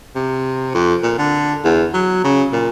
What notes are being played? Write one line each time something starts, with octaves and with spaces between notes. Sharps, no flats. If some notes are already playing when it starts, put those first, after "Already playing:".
C3
F2
A#2
D3
E2
F#3
C#3
A#2